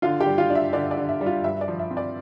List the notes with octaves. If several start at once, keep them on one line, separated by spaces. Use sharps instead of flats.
D3 F4 F5
G4 G5
G3
F4 F5
D4
E5
D3 D5
D5
D3
E5
G3
F4 F5
G2 E5
E5
D5
F3
E5
C4
D5